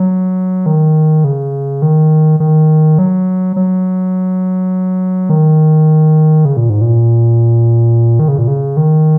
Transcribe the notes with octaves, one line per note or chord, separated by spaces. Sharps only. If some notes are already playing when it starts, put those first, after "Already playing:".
Already playing: F#3
D#3
C#3
D#3
D#3
F#3
F#3
D#3
C#3
A#2
G#2
A#2
D#3
C#3
A#2
C#3
D#3